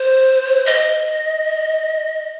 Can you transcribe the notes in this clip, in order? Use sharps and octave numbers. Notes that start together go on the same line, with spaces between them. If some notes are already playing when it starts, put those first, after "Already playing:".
Already playing: C5
D#5